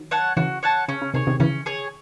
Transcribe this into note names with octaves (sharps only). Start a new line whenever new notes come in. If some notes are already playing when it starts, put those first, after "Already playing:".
Already playing: D#3 F#3
C#5 F#5 A5
C#3 E3 F#4
C#5 F#5 A5
C#3 C#4
C#3
C3 D#3 G#4 C#5
C3 D#3
C#3 E3 C#4
G#4 C#5